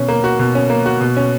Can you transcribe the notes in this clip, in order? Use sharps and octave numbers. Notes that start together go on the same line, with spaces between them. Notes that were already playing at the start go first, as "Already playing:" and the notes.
Already playing: B2 C#4
A#3
F#4
B2
C#4
A#3
F#4
B2
C#4